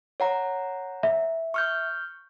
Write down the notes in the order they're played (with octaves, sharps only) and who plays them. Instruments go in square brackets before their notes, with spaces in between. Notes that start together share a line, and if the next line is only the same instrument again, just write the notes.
[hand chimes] C#5 F#5 A#5
[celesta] E5
[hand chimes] C#6 F6 G6